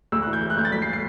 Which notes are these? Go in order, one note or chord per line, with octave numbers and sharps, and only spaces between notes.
D2 E6
F#6
E3
G6
E1
F#6
D2 G6
A6
G1 B6
C7
C7